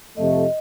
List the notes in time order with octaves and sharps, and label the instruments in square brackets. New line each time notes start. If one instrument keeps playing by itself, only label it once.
[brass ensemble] F2 C3 F3 A3 [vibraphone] D#5